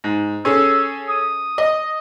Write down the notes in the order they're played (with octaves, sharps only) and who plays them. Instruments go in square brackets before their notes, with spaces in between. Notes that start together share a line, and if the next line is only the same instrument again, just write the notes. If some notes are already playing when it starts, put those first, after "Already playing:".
[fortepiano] G#2
[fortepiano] C#4 G#4 A4 [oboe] E6
[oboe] D#6
[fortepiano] D#5